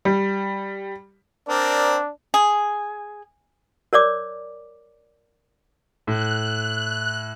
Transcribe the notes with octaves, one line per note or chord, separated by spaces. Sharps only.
G3
C4 D4 A#4 D5
G#4
A#4 C#5 D5 D6
A2 F#6